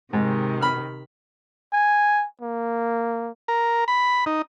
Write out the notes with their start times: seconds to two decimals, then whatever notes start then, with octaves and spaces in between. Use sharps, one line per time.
0.13 G#2 C3 D#3
0.61 B5 F6
1.73 G#5
2.41 A#3
3.48 A#4
3.88 B5
4.26 D#4